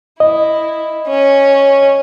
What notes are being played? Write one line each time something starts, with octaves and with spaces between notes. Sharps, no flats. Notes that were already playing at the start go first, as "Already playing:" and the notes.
E4 D#5
C#4